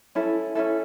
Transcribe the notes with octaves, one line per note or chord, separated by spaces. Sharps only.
C#4 E4 A4
C#4 E4 A4